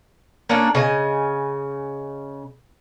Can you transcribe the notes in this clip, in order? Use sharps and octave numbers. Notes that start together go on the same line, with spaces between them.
A#3 C#4 D4 A4
C#3 D#5 G#5